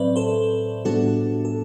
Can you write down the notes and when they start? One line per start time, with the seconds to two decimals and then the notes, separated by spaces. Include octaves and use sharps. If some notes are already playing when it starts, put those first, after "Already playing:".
Already playing: A2 F#3 C4 B4 C5 D5 E5
0.16 A4 C5
0.85 A2 G3 B3 D4 F#4 A4
1.45 A4